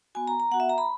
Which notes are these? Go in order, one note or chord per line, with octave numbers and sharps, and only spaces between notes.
B3 F#4 G#5
A#5
A#5
B3 F#4 F#5
E5
A#5
B5